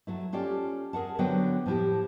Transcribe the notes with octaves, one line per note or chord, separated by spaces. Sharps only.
F#3 A3 E4
C#4 F4 G4 A4 D5
G#4 A#4 F#5 A5
D3 F#3 B3 F#4 C5 G5
A2 F3 E4 G4